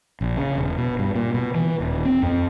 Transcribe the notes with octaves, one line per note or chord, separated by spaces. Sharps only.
A#1
C#3
E1
B2
G2
A#2
B2
E3
D#1
C4
F2